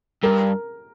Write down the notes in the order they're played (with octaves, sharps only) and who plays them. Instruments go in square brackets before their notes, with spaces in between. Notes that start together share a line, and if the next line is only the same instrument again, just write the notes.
[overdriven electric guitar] G2 [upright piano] A#4